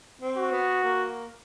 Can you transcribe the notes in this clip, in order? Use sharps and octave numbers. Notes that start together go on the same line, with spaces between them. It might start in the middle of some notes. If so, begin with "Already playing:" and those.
C4
F#4
B3
A#3